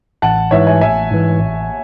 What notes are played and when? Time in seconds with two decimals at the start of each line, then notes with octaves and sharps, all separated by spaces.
0.22 A1 F#5 A5
0.51 G#2 E3 C#5 E5
0.67 E5 G#5
0.81 A1 E5 G#5
1.10 G#2 E3
1.39 A1